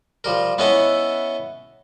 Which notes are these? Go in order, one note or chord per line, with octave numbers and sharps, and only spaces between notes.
F3 G3 A#4
B3 C#4 E4 A4 D#5 F#5